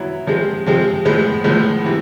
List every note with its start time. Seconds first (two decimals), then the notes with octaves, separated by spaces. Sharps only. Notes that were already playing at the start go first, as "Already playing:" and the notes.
Already playing: F#3 B3 E4
0.27 C3 F3 G#3 C4
0.66 C3 F3 G#3 C4
1.05 A2 F3 G#3 B3
1.44 A2 F3 G#3 B3
1.84 C3 E3